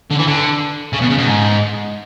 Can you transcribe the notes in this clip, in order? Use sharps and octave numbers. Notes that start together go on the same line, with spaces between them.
D3
E3
D3
C#3
B2
C#3
B2
G#2